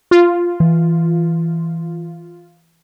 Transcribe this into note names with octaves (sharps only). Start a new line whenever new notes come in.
F4
E3